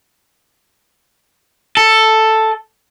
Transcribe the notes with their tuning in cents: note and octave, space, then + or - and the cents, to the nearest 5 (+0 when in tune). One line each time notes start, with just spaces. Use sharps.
A4 +5